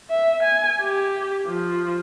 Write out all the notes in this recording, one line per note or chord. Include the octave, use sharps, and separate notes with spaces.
E5
G#5
G4
F3